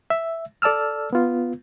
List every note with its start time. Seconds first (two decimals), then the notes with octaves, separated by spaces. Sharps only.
0.10 E5
0.62 A4 D5 A5 E6 F6
1.13 B3 F4